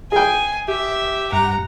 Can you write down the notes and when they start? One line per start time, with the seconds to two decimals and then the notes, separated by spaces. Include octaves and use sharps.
0.12 G#4 G5 G#5
0.68 G4 E5
1.32 G2 F#5 A#5